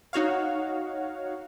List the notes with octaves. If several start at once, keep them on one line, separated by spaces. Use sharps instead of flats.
D#4 F#4 C#5 F5